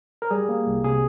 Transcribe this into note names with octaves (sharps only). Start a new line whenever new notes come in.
A#4
G3 G#4
A#3
C2
C3 G#4